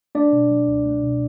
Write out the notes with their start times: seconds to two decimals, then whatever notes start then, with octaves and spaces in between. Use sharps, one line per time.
0.15 A3 D4 D5
0.33 B2
0.50 F#3
0.68 C#2
0.85 A3
1.03 B2